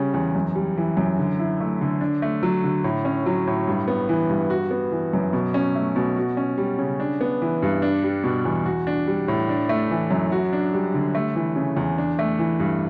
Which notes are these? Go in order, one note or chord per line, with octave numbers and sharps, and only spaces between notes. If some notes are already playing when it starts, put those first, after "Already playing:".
Already playing: C#3 G3 C#4
E2
F#2
G3
E3
F#2
D3
E4
A3
D3
D4
A3
F#3
D3
A2
C#4
F#3
A2
G2
B3
E3
G2
F#4
B3
E3
F#2
B2
C#4
A3
B2
F#4
C#4
G3
C#3
D4
B3
E3
G2
D4
G3
B2
E2
F#4
D4
G3
A2
D4
A3
E3
F#2
F#4
D4
G3
D3
A3
E3
C#3
E2
D4
A3
E3
G2